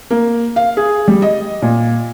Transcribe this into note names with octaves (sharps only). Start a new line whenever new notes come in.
A#3
F5
G#4
G3
D#5
A#2